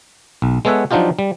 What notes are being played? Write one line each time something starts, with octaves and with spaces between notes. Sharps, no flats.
B1
G#3 B3 A4 C#5 E5 F#5
F3 F#3 D4 D#4 F4 G4
G3